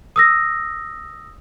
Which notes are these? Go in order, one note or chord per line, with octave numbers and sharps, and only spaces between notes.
D#6 E6 A#6